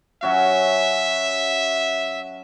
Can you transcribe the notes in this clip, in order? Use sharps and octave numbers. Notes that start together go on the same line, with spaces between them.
F#3 C#4 F#4 E5